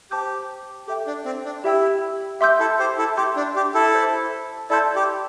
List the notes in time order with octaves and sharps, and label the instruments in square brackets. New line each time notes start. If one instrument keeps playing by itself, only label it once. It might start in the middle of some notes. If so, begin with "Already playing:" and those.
[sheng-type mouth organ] G4 [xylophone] C5 A5 D6 G6
[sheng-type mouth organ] G4 [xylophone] A4 E5 G5
[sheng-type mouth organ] D4
C4
D4
[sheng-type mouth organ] E4 [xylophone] G4 E5 G5 E6
[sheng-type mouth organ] G4 [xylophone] E5 C6 E6 G6
[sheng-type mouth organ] E4 A4
G4 C5
E4 A4
[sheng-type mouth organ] G4 [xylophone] E5 C6 G6
[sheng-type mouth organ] D4
G4
E4 A4
[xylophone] C5 A5 E6 G6
[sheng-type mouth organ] E4 A4 [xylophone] D5 A5 C6 G6
[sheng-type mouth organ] G4